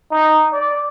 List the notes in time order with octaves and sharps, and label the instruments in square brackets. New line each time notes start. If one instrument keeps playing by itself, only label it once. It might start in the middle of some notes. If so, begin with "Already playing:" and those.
[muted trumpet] D#4
D5